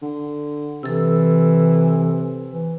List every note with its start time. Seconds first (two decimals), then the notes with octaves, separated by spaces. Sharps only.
0.02 D3
0.83 C3 E3 A4 E6
2.51 E3